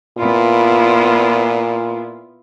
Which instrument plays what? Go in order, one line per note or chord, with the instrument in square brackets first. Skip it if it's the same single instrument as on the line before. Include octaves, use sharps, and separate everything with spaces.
[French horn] A#2 [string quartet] B3 E4 F4